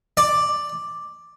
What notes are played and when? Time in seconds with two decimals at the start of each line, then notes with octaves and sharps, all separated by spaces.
0.17 D5